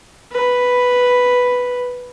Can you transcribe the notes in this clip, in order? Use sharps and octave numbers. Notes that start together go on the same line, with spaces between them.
B4